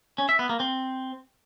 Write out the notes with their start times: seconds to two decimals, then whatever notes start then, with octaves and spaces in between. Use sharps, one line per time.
0.18 C#4
0.29 E5
0.39 B3
0.49 A#3
0.60 C4